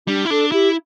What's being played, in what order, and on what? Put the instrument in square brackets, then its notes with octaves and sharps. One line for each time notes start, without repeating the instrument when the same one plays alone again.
[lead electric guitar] G3 [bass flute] D4
[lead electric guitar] E4
[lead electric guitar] D4 [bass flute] A4
[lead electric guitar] E4 [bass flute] G4